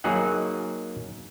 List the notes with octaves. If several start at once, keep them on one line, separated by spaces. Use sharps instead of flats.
F#3 A#3 D#4 F#4 G#4 F#5